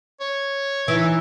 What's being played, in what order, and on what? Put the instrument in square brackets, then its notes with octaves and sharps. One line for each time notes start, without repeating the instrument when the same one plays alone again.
[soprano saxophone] C#5
[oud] E3 [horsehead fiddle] D#4 E4 [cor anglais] E5